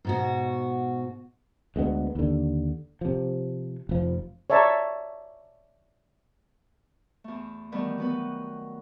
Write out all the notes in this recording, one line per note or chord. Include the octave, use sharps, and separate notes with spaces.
G#2 B2 F#4
D2 G#3 B3
D#2 D3
C3 F3
F1 F3
C#5 D5 E5 A5 A#5 C#6
E2 A3
D#3 E3 G3 A3 B3
F#3 B3 B4